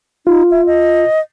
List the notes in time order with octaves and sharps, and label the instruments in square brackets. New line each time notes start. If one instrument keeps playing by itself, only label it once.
[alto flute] D#4 [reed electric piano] F4
[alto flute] E5
D#5